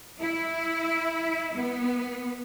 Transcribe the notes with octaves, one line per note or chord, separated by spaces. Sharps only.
E4
B3